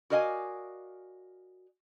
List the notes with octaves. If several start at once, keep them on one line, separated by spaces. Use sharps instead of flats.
F#4 A#4 D5 D#5 F5 G#5